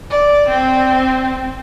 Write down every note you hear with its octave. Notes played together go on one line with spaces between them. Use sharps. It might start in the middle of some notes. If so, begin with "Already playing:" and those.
D5
C4